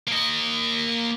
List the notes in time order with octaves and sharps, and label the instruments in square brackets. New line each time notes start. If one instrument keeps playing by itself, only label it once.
[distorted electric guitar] A#3 D#5